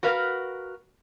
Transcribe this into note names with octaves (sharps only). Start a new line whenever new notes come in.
F#4 A#4 B4 F5